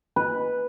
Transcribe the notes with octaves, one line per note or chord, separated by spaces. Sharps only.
B4